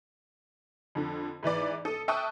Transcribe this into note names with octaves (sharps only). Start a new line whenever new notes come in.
F2 D3
G#2 E3 B4 D5
A4 D#6
E5 G5 A5 C#6 D#6 F#6